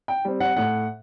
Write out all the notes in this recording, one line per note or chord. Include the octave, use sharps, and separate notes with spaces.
G5
G3 C4
F#5
A2 F#5